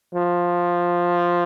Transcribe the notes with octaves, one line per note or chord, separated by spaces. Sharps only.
F3